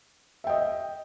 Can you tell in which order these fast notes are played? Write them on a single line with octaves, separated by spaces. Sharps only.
E5 G5 D#5